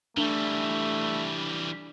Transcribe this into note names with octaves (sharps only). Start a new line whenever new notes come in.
E3 G3 A3 D4